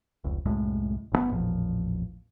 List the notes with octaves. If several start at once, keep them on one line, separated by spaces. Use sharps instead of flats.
F1 C#2
C2 F#2 A2 G#3
F#1 C#3 B3
A1 E2 A#2 F3